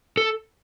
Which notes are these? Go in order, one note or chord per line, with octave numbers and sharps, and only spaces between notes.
A4